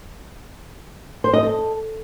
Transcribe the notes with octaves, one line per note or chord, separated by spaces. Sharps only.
C5
D#5
A4